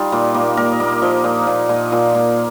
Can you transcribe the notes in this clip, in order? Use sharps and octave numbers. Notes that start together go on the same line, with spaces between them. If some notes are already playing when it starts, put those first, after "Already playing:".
Already playing: G3 D#4 F4
A#2
A#3
A#3 A#4
D#5
A#3
F3 D#5
A#2
A#2
A#2
A#2
A#3